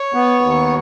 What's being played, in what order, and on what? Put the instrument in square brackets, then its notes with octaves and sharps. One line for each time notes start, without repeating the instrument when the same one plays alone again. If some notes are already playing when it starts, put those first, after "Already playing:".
Already playing: [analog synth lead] C#5
[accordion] B3
D#2